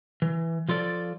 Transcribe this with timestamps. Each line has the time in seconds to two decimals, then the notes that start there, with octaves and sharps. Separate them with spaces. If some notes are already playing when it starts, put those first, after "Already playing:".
0.22 E3
0.69 F3 F4 A4 D5